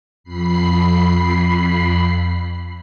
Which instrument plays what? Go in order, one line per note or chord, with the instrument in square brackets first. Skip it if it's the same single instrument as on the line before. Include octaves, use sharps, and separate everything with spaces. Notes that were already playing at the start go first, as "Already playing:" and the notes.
[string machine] F2 B5 C7